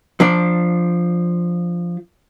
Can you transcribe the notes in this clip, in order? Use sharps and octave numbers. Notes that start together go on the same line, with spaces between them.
F3 D4 D5